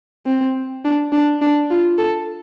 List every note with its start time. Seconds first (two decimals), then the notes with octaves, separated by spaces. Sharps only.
0.26 C4
0.84 D4
1.12 D4
1.42 D4
1.71 F4
1.98 A4